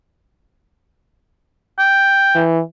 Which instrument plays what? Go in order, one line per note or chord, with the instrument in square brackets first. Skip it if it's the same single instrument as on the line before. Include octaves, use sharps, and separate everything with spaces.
[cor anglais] G5
[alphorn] E3